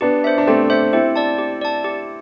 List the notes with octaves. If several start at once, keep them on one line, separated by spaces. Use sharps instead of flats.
B3 D4 G4
C5 E5
D4
A3 C4 G4
C5 E5
C4 E4 G4
D5 A5
G4
D5 A5
G4